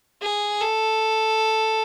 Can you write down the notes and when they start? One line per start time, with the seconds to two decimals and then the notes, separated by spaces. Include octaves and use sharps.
0.22 G#4
0.61 A4